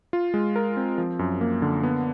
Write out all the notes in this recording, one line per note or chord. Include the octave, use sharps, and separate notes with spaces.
F4
G#3
A#4
C4
F3
F#2
A#3
D3
B3